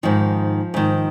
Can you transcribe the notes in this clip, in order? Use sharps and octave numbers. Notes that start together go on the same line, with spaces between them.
G#2 D#3 F3
G#2 D#3